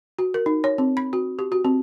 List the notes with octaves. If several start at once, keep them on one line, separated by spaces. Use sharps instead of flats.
F#4
A#4
D#4
C#5
C4
B5
F#4
G4
F#4
C4